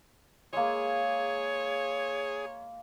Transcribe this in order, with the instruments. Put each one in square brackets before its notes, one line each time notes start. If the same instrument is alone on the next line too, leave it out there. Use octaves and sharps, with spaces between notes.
[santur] G#3 A#3 [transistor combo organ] G#4 [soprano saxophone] C#5